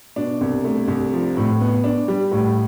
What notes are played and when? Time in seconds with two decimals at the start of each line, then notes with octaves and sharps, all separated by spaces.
0.16 B2 D4
0.41 C2
0.64 A3
0.88 C2
1.13 F3
1.37 A2
1.61 B3
1.84 D4
2.08 G3
2.32 A2